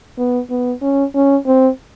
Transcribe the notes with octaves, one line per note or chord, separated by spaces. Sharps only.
B3
B3
C#4
C#4
C4